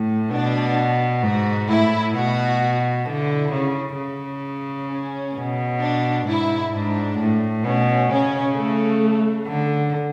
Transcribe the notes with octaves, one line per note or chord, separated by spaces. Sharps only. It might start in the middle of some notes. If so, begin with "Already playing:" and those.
Already playing: A2
B2 D4
G#2 F#4
A2 E4
B2 F#4
D3 E4
C#3
C#3
C#4
B2
D4
G#2 E4
G#2 D4
A2
B2 C#4
C#3 C#4
A3
D3